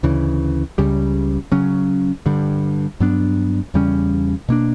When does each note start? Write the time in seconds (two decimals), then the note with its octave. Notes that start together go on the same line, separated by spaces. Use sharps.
0.03 D2 C#3 E3
0.78 C#2 C#3 G3
1.52 C#3 F#3 C#4
2.26 G2 D3 G3
3.00 G2 F#3 B3 D4
3.74 E2 C#3 G3 C#4
4.49 B2 A#3 D4